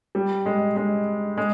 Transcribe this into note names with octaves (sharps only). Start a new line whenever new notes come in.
G3
G#3
G#3
G#3